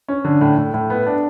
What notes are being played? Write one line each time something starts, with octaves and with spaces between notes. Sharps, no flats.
C#4
D3
A2
A2
A2
B3
D4